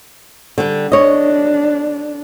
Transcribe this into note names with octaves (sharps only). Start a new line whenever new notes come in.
D3 G3
D4 C#5 D#5